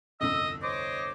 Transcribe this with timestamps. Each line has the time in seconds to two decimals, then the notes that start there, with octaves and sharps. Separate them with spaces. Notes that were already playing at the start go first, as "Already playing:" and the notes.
0.21 G1 C2 F2 D#5 E6
0.62 C5 C#5 D#5 D6